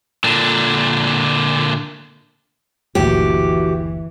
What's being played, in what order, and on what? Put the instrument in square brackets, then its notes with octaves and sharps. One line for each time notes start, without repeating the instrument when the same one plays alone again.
[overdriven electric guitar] A#2 D3
[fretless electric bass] F#1 D2 A#2 [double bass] E3 [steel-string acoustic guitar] F#4 G4